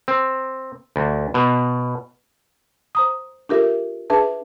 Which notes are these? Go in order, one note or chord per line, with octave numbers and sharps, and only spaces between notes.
C4
D2
B2
C5 A#5 D#6
D4 F4 G4 A4 A#4 E5
D4 G#4 B4 E5 A5